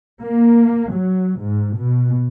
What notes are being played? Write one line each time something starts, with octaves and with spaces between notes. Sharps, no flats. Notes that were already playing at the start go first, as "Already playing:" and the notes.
A#3
F#3
G#2
B2